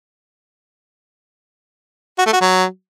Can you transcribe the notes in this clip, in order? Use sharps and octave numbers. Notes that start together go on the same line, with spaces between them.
F#4
A3
F#4
F#3